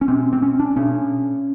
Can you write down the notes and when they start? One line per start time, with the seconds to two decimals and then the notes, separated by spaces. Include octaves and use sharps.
0.01 C#4
0.08 B2 C4
0.33 C4
0.42 C#4
0.60 D4
0.76 B2 C#4